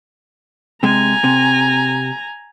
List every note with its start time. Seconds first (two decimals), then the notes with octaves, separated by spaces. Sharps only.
0.83 C3 G#3 G#5 A#5
1.24 C3